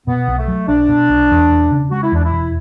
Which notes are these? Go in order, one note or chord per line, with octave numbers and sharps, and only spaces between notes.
B2 B3
B1
A3
F#3
B1 D4
B2
B1
E2
E1
C#3
G#3 F#4
E4
E2 D4
E4
E1